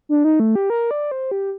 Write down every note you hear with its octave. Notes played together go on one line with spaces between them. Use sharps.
D4
D#4
A3
G4
A#4
D5
C5
G4